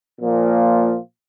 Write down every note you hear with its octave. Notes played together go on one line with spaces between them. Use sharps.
A#2 F3 A#3 F4